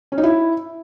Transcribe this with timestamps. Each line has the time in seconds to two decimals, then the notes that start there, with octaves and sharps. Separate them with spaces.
0.12 C#4
0.18 D#4
0.23 E4